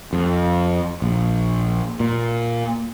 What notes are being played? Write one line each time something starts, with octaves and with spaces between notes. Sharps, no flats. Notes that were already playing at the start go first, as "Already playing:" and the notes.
F2
A#1
A#2